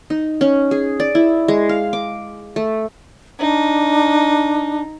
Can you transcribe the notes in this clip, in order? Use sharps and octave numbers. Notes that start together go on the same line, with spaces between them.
D#4
C#4
G#4
D5
E4
G#3
F5
D6
A3
D4 D#4